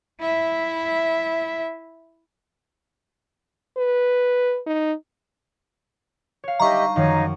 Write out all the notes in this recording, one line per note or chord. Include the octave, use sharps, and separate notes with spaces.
E4 E5
B4
D#4
C#5 F5
G3 D4 D#4 G4 D#5 E5 A#5 C#6
F#2 D#3 F3 D#4 C#5 F5